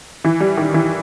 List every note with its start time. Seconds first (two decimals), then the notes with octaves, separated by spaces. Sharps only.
0.24 E3
0.40 G3
0.57 D#3
0.74 E3